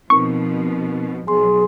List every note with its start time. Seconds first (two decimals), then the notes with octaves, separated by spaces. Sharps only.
0.10 B2 F3 C4 D#4 A#4 C#6
1.27 B1 G#4 G#5 C6